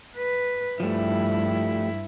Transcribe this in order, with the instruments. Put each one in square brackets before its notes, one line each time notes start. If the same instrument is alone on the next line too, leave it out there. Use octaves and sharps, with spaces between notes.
[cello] B4
[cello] G2 E4 [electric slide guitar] F3 G3 A3